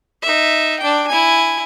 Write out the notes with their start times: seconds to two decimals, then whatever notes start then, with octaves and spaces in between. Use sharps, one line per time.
0.22 D#4 E5
0.79 D4 G5
1.07 E4 G#5